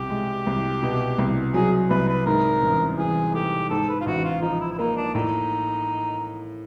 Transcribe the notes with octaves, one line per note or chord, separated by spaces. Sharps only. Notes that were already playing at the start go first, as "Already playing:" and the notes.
Already playing: C2 B2 G4
G#3
C2
B2
C2
F#3 G#4
C2 B4
B4
G#2 A#4
A1
E3 G#4
A3 G4
G#2 A4
B4
F4
A1 F#4
F4
F3 D#4
E4
E4
A#3 D#4
D4
A2 D#4